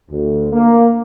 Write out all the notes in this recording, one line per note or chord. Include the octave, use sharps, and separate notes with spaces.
D2
A#3